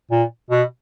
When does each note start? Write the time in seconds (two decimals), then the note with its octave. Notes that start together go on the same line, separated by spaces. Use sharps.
0.11 A#2
0.51 B2